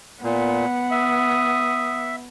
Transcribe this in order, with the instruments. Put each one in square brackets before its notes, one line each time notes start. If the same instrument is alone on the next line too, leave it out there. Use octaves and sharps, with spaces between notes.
[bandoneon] A#2 [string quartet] B3 F#5
[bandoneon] E5 [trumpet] D#6